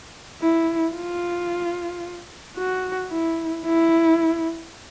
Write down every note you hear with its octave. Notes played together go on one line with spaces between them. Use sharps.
E4
F4
F#4
E4
E4